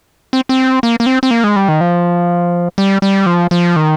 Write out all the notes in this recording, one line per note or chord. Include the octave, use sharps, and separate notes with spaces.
C4
C4
A#3
A#3
C4
C4
A#3
G#3
G3
D#3
F3
G3
G3
F3
F3
D#3